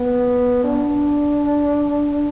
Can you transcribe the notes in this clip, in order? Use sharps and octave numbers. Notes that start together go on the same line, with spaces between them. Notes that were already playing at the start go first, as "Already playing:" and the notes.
Already playing: B3
D4